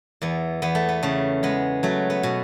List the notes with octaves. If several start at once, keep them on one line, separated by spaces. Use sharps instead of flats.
E2 B3
E2 B3
A3
B3
C#3 A3
G#3 B3
F#3 A3
B3
B2